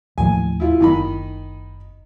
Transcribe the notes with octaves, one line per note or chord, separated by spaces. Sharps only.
D#2 A2 F3 G#5
E4 F4
F#1 D#3 D#4 B5